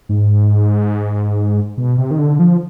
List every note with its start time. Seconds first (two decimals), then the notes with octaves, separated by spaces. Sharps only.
0.09 G#2
1.77 B2
1.98 C3
2.11 D#3
2.19 D3
2.39 F3